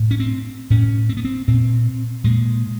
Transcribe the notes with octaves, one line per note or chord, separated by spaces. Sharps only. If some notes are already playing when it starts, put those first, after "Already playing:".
Already playing: A2
C#4
C4
A2 C#4
C4
B3
C4
A#2 C4
A#2 G#3